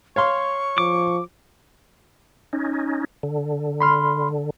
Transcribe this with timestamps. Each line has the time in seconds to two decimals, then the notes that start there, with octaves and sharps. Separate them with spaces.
0.16 C#5 F5 C6 C#6
0.78 F3 D6
2.53 C#4 D#4
3.23 D3
3.80 B5 C6 F6